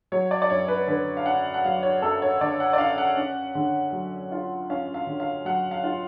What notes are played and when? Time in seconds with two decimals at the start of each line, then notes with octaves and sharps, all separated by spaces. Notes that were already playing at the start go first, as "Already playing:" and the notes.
0.12 F#3 C#5
0.31 D5
0.42 D5
0.50 F#2 C#5
0.68 B4
0.88 D3 B4
1.17 F5
1.26 C#4 F#5
1.54 F#5
1.64 F#3 F5
1.83 C#5
2.02 F#2 A4
2.22 C#5
2.41 D3 D5
2.60 F#5
2.73 D5
2.78 C#4 F5
2.98 F#5
3.17 C#4
3.55 D3
3.92 F#3
4.32 F4
4.70 C#4 F5
4.94 F5
5.07 D3
5.20 F5
5.45 F#3 F#5
5.71 F5
5.84 F4